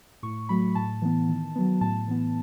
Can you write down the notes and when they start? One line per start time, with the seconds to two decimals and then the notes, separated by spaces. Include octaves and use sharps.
0.23 A2 C#6
0.49 F#3 A3 B5
0.75 A2 A5
1.02 E3 B3
1.29 D#3
1.56 F#3 B3
1.81 A2 A5
2.08 E3 B3